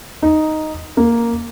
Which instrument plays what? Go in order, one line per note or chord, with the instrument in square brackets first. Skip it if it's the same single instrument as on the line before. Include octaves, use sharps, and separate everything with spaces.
[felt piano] D#4
A#3